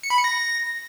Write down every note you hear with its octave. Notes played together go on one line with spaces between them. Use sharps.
C#7
B5
C#7
A#6